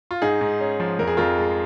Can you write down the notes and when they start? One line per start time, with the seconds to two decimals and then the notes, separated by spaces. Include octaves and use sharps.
0.11 F4
0.22 G#2 D#4 G#4
0.41 G#2
0.60 C#4
0.80 F3
0.99 F2 A#4
1.07 G#4
1.17 F2 F4 A#4
1.38 G#3